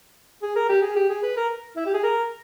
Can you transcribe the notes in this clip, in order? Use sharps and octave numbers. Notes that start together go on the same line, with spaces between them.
G#4
A#4
G4
G#4
G4
G#4
B4
A#4
E4
G4
G#4
A#4